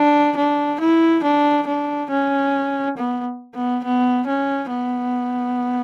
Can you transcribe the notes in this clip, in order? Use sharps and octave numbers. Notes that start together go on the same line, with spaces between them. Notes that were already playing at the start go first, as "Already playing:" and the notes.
Already playing: D4
D4
E4
D4
D4
C#4
B3
B3
B3
C#4
B3